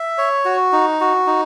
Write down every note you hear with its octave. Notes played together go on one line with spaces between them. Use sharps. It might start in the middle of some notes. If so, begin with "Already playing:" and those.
Already playing: E5
C#5
F#4
D#4
F#4
D#4